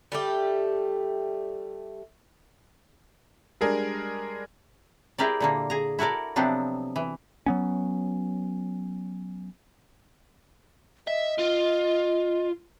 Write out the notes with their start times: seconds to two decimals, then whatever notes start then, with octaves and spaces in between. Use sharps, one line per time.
0.12 G3 A3 G4
3.61 G3 G#3 D4 G#4 A#4
5.18 E4 G4 G#4 A#4 C5 D5
5.40 A#2 D3 A#3
5.70 G#4 A#5
5.99 E4 F#4 A4 A#4 D5
6.36 C3 F3 F#3 B3 C4 D4
6.96 E3
7.46 F#3 B3 C#4
11.08 D#5 E5
11.39 F4